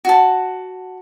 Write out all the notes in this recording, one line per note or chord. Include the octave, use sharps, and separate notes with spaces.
F#4 A5